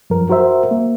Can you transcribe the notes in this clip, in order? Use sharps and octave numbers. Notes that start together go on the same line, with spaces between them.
F#2 F3 A#4
F#4 A#4 C5 E5
A#3